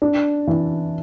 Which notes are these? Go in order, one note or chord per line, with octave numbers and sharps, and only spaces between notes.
D4
E3